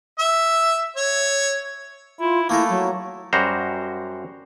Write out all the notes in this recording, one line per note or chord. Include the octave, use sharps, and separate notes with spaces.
E5
C#5
E4 F4
A3 A#3 E4 G#4 A#4
F#3
F#2 G3 F#4 C5 A#5